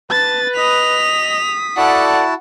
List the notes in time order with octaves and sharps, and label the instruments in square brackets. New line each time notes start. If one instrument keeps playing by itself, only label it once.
[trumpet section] B4 [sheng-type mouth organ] A5 [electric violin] A6
[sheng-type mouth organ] D#5 [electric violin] D#6 B6 [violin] F7
[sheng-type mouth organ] E4 F#4 A5 [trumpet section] A4 D5 [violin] F#5